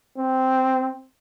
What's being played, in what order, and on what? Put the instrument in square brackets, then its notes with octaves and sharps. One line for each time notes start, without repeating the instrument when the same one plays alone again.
[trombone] C4